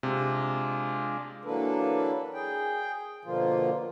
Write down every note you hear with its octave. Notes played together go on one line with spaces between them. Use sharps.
C3 G#3 D4 F4
E3 F#3 A#3 D4 A4 B4
G#4 G5
B2 D3 F3 A#3 F4